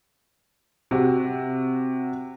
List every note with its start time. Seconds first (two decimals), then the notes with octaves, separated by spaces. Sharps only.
0.91 C3 F#4